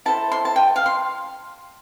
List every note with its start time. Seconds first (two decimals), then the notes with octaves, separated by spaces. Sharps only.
0.06 E4 A4 C5 A5
0.32 C6
0.45 A5
0.56 G5
0.76 F5
0.86 C6